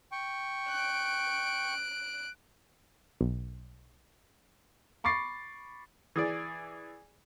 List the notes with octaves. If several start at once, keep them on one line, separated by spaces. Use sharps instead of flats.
G5 C#6
F#6 D7
B1
B5 C#6 D6 A6 C7
E3 G#4 D5